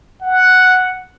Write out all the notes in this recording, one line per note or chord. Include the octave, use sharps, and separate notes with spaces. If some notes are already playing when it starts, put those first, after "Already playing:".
F#5